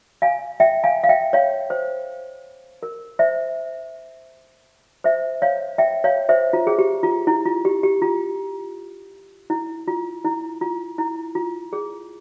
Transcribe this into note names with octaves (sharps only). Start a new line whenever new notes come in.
F5 G#5
E5 G5
F5 G#5
F5
E5 G5
C#5 F5
C5
A#4
C5 E5
C5 E5
C#5 F5
E5 G5
C#5 F5
C5 E5
F4
G#4
G4
F4
E4
F4
G4
G4
F4
E4
F4
E4
F4
E4
F4
G#4